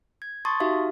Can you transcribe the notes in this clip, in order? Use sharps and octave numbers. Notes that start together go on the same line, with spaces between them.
G#6
A5 C6 C#6 D#6 A6
D#4 F#4 G4 E5 F5